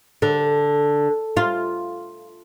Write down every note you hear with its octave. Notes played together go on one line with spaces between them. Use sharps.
D3
F4